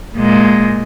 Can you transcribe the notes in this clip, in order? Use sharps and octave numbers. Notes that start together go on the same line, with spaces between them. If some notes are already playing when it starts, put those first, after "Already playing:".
A#2 G#3